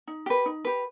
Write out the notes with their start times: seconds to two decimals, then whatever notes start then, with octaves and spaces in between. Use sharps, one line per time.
0.08 D#4
0.26 G4 B4
0.46 D#4
0.65 G4 B4